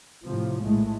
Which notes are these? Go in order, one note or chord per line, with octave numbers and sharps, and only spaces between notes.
A2 C3 F3
A#1 A2 G#3 A3